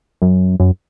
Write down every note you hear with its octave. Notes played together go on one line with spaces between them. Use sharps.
F#2
F#2